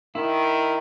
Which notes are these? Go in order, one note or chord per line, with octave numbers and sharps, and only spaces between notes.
D#3 E4